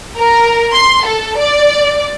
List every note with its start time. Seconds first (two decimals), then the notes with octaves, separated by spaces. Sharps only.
0.18 A#4
0.74 C6
1.07 A4
1.38 D5